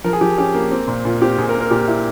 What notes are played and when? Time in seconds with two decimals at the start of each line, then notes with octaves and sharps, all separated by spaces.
0.04 F3 A#4
0.13 G#4
0.21 F3 G4
0.38 C#4 G4
0.54 A#3
0.71 C4
0.88 A#2
1.05 A#2 F4
1.21 C4 G4
1.38 A#2 G#4
1.49 A#4
1.55 A#3
1.61 A#4
1.71 A#2 G4
1.88 E4